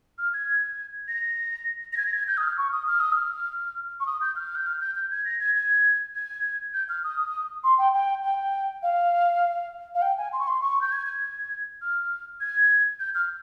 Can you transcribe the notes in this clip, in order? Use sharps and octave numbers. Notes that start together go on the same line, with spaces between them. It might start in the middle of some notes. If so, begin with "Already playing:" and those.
F6
G#6
A#6
A#6
G#6
A#6
G#6
G6
D#6
F6
C#6
D#6
F6
D#6
F6
C#6
D#6
G6
F6
G6
F6
G6
G6
G#6
A#6
G#6
G#6
G#6
G6
F6
D#6
C6
G5
G5
G5
F5
F5
G5
G#5
C6
C#6
C6
C#6
G6
G#6
G#6
F6
G#6
G6
F6